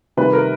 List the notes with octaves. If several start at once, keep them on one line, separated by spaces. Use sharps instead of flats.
C3 D#3 G3 B4
A#4